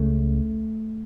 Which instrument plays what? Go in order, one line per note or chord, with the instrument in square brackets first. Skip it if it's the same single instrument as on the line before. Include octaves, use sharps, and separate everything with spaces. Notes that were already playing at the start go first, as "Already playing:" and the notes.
Already playing: [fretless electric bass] C#2 C#3 A3